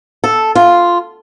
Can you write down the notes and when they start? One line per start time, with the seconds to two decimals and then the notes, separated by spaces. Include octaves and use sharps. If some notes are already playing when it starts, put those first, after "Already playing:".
0.24 A4
0.55 F4